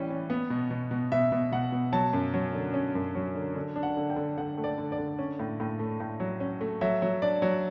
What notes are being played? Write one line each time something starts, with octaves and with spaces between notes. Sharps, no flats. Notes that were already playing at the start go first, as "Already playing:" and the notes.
Already playing: A2 E3 G3 C#4
C#4
B3
B2
B2
B2
B2 E5
B2
B2 F#5
B2
F#3 A5
F#2
F#3
D3
C#4
F#2
F#3
D3
D3
D4
F#5
D3
G5
D3
D3 F#5
A3
D5
D3
D5
D3
C#4
A2
A2
A3
A2
F#3
C#4
A3
F#3 E5
F#3
D4 D5
F#3